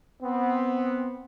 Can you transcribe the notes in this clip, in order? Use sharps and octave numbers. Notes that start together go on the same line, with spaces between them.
B3 C4